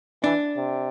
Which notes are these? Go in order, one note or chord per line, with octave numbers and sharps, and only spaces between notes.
E3 D4
C3